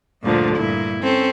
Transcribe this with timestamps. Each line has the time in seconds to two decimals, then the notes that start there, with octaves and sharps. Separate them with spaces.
0.23 D2 G2 A#2 D3 F3
0.56 G2 A#2 E4
1.01 C4 C#4 A4